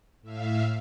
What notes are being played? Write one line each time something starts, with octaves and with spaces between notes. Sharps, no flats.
A2 E5 F5